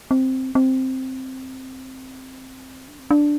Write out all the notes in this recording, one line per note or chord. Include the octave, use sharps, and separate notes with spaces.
C4
C4
D4
C4
D4